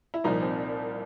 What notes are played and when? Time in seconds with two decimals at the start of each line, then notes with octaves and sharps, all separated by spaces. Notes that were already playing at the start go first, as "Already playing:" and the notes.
0.14 E4
0.24 C2 A#2 F3 D#4
0.42 C4